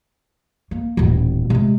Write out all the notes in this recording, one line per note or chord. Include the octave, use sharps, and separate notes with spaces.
A#3
D#1 A1
C3 G#3